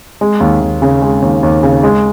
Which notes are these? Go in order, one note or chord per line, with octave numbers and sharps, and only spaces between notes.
G#3
D#2
D#2
C#3
G#3
D#2
D#2
C#3
G#3